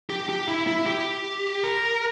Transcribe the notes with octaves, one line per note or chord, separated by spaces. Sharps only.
G4
G4
E4
E4
G4
A#4